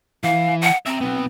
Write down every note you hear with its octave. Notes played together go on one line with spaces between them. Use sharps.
E3 F5
F#5
C4 E5 A#5
B1 B3